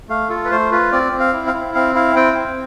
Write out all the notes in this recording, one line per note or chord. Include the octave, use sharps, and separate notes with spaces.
A3 F5
F4 A4
B4
A3 C5
F4 B4
C4 D5
C4
F5
E4
F5
E4
C4 F5
E4 F5
C4 G5
C4